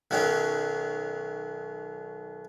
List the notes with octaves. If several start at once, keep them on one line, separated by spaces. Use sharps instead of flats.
B1 D#3 F#3 C#4